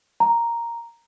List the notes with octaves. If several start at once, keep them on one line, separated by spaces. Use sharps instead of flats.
A#5